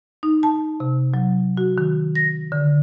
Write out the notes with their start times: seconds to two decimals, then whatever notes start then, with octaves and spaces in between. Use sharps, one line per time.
0.23 D#4
0.43 A5
0.80 C3
1.14 F#3
1.57 F#4
1.78 D#3
2.15 A#6
2.52 D3